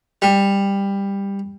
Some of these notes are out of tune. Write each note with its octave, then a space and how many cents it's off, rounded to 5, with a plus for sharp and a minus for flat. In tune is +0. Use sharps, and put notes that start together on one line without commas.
G3 +15